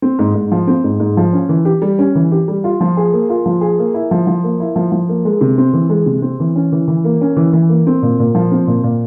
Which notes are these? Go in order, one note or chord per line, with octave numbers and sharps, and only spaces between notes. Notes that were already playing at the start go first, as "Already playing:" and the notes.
C4
G#2
G#2
F3
C4
G#2
G#2
F3
C#4
E3
G4
G3
C#4
E3
G4
G3
F4
F3
G#4
A#3
F4
F3
G#4
A#3
E4
F3
F3
A#3
E4
F3
F3
A#3
G#3
C3
C4
E3
G#3
C3
C4
E3
C#4
E3
E3
A#3
C#4
E3
E3
A#3
C4
A#2
A#2
F3
C4
A#2
A#2